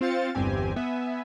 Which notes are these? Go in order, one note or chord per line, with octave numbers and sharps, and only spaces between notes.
C4 F4 C5 F5 A6 C#7
G1 E2 G2 C4 G4 G#5
B3 E5 G#5